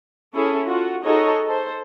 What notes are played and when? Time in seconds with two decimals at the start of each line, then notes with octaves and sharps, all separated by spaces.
0.34 C#4 E4 G#4 A4
0.67 F4 F#4
1.04 D#4 F#4 G#4 A4 C#5 D#5
1.46 A4 C5